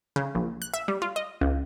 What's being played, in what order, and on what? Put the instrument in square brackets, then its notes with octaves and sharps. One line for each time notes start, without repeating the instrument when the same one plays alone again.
[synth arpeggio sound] C#3
A#1
F#6
E5
G3
F4
D#5
C#2